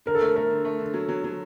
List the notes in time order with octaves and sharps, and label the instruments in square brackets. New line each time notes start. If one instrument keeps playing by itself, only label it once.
[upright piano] D3 [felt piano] A#4
[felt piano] A4
[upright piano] A3 [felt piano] A#4
[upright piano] A3 [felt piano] A#4
[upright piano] D3
A3
D3
F#3
F#3
F#3